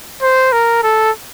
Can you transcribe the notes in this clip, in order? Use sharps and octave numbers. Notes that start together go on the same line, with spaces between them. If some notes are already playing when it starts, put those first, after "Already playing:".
C5
A#4
A4